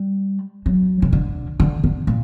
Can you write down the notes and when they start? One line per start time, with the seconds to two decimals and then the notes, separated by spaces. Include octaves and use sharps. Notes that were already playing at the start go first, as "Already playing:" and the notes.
Already playing: G3
0.66 F#3
1.02 C#3
1.13 D3
1.60 D3
1.84 D3
2.07 A#2